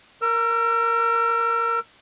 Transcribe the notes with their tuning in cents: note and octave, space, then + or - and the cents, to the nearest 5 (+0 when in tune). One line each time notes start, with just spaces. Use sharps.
A#4 +0 E6 +35